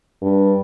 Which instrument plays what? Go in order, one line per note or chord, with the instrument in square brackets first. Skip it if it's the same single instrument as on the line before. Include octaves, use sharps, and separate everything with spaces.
[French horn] G2